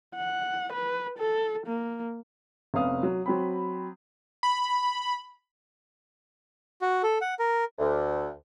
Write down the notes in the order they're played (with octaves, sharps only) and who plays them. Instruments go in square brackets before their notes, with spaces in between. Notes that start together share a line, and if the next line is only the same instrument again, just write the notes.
[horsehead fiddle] F#5
B4
A4
A#3
[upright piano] F1 C3 B3 C#4 F5 D#6
F#3
F#3 C4 B5
[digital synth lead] B5
[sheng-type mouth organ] F#4
A4
F#5
A#4
[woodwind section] D2